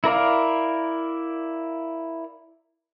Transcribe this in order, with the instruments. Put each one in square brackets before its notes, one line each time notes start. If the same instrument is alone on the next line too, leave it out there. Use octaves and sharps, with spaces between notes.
[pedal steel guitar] E4 A#4 D5 F5